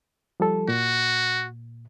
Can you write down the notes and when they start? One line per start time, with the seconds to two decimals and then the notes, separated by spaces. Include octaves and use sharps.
0.40 F3 G3 A4
0.68 A#2 F#4